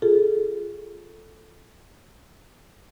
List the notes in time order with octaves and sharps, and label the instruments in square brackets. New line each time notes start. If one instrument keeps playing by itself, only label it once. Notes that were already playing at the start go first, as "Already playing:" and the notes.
[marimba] F4 G#4 A4